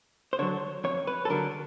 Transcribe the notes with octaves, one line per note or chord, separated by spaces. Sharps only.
C5
D3 F#3 C#5
F2 C#5
B4
A4
D3 F#3 A#4